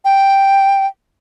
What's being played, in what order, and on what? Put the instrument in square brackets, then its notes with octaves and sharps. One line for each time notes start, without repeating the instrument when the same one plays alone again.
[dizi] G5